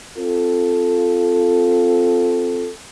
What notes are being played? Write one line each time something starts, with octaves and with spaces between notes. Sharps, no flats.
C4 F4 A4